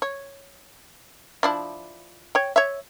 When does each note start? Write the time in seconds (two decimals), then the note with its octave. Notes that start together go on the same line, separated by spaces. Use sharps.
0.02 C#5
1.43 F3 D4 E4
2.35 C#5 G5
2.56 C#5 E5